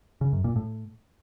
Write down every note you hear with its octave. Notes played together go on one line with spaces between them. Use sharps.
C#3
F#2
A#2
A2